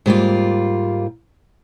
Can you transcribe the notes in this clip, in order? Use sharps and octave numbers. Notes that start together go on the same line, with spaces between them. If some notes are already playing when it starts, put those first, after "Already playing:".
G#2 G3 A#3 F4